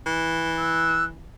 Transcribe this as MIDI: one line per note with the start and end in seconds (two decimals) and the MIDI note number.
0.06 1.28 52
0.58 1.05 88
0.58 1.05 90